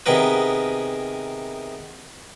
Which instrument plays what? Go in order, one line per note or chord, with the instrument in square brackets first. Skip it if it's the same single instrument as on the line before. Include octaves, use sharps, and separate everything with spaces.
[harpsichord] C3 D#3 B3 G#4 A#4 B4